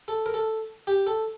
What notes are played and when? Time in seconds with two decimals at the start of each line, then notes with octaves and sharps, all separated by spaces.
0.08 A4
0.26 A#4
0.34 A4
0.87 G4
1.07 A4